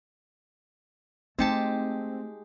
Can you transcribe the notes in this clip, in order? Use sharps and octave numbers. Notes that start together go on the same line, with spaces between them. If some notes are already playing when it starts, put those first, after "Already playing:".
G#3 A3 C4 D#4 G4 G5 A5